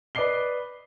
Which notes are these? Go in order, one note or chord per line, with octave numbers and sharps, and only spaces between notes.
B4 D5 D#5 D6 C7 G7